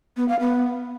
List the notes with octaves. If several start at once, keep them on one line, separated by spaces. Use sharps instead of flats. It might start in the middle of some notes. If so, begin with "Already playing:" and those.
B3
F5
B3